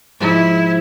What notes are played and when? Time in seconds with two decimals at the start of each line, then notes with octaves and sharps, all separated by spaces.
0.20 G#2 F3 G#3 E4